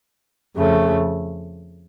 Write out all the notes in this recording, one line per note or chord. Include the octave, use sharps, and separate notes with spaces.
F2 C#3 A3